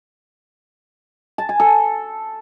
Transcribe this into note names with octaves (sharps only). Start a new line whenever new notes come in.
A5
G#5
A4